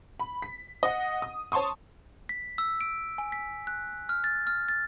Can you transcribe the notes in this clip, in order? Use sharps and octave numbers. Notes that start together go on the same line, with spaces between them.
B5
B6
D#5 F#5
D#6
C#5 A5 C6 C#6 D#6
B6
E6
D7
G#5
B6
F#6
F6
A6
F6
A6